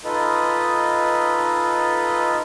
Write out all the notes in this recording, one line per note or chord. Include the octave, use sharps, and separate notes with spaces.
D#4 F4 A4 B4 D#5